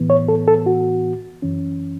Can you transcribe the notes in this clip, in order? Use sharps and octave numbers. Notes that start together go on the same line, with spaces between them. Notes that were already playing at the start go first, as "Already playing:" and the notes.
Already playing: A2 E3 B3
C#5
A4
A4
F#4
F#2 E3 C#4